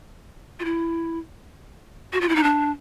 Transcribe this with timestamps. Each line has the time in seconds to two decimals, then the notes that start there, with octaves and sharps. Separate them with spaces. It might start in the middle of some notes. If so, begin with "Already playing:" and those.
0.60 F4
0.65 E4
2.13 F#4
2.21 F4
2.29 E4
2.36 D#4
2.43 D4